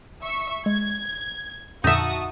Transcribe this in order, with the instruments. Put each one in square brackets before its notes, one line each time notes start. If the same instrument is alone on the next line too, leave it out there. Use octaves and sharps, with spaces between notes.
[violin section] E5 C#6
[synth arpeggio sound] G#3 [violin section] G#6
[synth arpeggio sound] F2 A#2 D3 [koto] D#4 E5 [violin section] F#4 A5 D#6